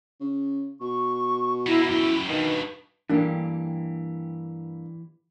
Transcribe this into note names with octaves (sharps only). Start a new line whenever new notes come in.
C#3
B2 C#6
A#3 B3 E4
F#2 E4 G4
G2 B2 D#3 B4
G2 E3 A#3 D4 G4